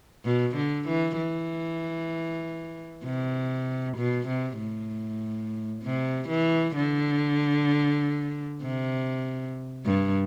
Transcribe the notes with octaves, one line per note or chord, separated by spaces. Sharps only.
B2
D3
E3
E3
C3
B2
C3
A2
C3
E3
D3
C3
G2